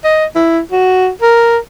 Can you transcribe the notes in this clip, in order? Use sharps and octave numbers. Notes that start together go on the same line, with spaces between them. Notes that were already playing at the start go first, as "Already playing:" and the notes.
D#5
E4
F#4
A#4